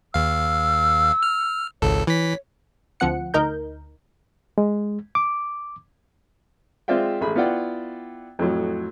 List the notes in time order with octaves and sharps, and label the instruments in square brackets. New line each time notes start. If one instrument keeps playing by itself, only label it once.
[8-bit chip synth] D#2 F5 [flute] E6
[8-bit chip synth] F6
[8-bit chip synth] G#1 C#2 A4 [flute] C#5
[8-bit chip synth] E3 B6 [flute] C#5
[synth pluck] D2 F3 C4 F#5 C#7
D2 D#4 A#4 G6
[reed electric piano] G#3
D6
[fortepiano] G#3 C4 F4 D5 E5 G5
A1 G#4 B5
B3 E4 F4 D5 F#5 G5
F2 A2 F#3